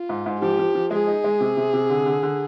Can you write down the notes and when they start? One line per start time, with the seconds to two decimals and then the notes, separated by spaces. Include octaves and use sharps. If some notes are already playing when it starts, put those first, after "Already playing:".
Already playing: F4
0.09 G#2
0.26 G#2
0.41 F3 G4
0.59 F3
0.75 F3
0.91 G#3 G#4
1.07 D#4
1.24 G#3
1.40 C3
1.57 C3
1.73 C3
1.90 D3
2.06 D3
2.23 D3